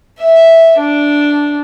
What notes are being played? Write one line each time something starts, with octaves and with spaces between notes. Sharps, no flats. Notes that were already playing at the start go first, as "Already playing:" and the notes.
E5
D4